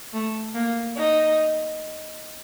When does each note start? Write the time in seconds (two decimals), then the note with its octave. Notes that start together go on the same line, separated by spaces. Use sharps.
0.13 A3
0.55 A#3
0.98 D#4